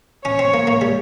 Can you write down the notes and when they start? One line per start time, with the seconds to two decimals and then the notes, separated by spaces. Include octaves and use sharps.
0.25 C#4 C#5
0.39 C4
0.54 A#3
0.67 A#3
0.81 G3